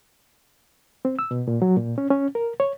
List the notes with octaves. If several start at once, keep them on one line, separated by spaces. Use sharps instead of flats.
C4
E6
B2
A#2
F#3
A#2
C#4
C#4
A#4
C#5